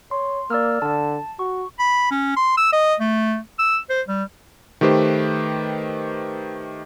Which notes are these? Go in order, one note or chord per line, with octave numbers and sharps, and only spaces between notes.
C#5 C6
A#3 D5 E6 F6
D3 A5
F#4 C#6
B5
C#4
C6
E6
D#5
A3
E6
C5
G3
D#3 A3 G4 B4 C5